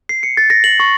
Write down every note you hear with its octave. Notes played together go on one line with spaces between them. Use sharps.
C7
C#7
A6
A#6
F#7
C#6